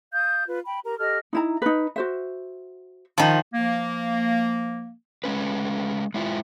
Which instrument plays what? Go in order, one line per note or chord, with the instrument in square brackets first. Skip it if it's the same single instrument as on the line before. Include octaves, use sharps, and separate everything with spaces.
[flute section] F5 D#6 G6
F4 B4
G5 B5
G4 A#4 A#5
G4 A4 D#5 F6
[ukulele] D#4 E4 A#5
D#4 B4
F#4 C5 E5
[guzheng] D#3 F3
[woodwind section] F3 A#3
[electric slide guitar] G#3 A3 C#4 B4
G#3 E4 F4